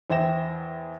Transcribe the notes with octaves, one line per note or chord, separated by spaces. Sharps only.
E2 C5 E5 G5 A#6 E7